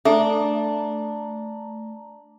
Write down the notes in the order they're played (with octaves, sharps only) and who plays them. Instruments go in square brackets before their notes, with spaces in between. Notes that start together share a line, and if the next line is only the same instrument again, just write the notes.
[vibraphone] A3 A#5 [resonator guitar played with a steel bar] D4 [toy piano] A4 E5